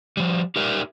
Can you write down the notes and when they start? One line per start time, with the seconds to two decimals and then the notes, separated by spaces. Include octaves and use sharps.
0.17 F3 G3
0.56 D#4 G4 A#4 E5